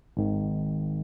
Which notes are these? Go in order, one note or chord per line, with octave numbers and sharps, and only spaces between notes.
G#1 G#2 D#3